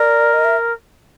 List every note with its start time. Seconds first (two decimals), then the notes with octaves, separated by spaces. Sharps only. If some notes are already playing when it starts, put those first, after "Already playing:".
Already playing: A#4 D5
0.33 D#5
0.45 E5